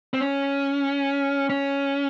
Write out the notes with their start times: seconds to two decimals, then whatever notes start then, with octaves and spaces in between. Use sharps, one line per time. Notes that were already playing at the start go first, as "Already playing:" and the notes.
0.14 C4
0.21 C#4
1.50 C#4